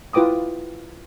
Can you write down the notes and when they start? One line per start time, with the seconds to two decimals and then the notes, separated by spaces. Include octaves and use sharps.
0.13 E4 F4 B4 G5 D6 D#6